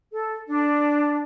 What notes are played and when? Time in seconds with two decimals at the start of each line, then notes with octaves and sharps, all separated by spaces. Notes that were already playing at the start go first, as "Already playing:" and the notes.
0.12 A4
0.48 D4